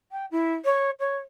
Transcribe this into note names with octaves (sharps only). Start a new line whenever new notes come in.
G5
E4
C#5
C#5